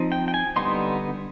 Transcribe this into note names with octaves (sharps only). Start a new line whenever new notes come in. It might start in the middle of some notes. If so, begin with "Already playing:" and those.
Already playing: F3 C4 D#4
G5
G5
G#5
D3 G3 B3 D#4 C6